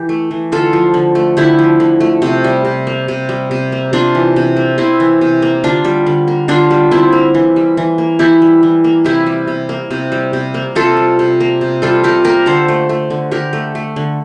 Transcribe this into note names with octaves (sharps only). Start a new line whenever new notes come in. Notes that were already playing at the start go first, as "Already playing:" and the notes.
Already playing: E3 G4
A3
E3
D3 F4 A4
F3
D3
A3
D3 E4 G4
F3
D3
A3
C3
G3
C3
A#3
C3
G3
C3
A#3
C3 D4 F4
E3
C3
A#3
C3 C4 E4
E3
C3
A#3
D3 D4 F4
G3
D3
A#3
D3 D4 F4
G3
D3 C4 E4
A#3
E3
G3
E3
A#3
E3 E4 G4
G3
E3
A#3
C3 E4 G4
G3
C3
A#3
C3
G3
C3
A#3
C3 F4 A4
G3
C3
A#3
C3
G3 F4 A4
C3 G4 A#4
A#3 G4 A#4
D3 A4 C5
A3
A3
D3
D3 G4 A#4
A3
A3
D3